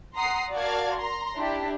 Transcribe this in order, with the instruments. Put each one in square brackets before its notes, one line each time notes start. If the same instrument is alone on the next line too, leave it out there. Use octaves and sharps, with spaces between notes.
[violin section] F#5 A#5 C6 D#6 C7
F#4 A#4 D5 F5 A5 G#6
A#5 C6
D4 E4 G4